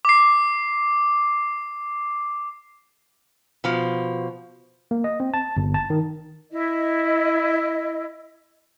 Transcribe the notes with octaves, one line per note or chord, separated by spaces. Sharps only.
D6 C7
B2 F3
A#3
D#5
C4
A5
G1
A5
D#3
E4 D#5